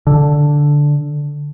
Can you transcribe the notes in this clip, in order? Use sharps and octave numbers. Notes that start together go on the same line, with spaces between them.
D3